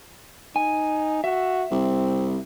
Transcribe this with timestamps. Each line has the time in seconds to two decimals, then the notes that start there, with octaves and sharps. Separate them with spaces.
0.56 D#4 G#5
1.24 F#4 E5
1.71 C2 C4